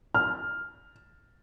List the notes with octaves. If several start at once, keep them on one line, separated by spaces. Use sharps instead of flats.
F6